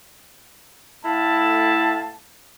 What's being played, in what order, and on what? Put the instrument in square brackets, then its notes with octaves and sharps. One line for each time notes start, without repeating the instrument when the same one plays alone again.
[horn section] A2 A3 E4 F5 A5